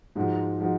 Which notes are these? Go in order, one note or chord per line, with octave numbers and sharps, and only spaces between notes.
G#2 F3 G#3 D#4 F#4
F3 G#3 D#4 F#4